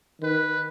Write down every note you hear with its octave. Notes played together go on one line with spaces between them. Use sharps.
D#3 B4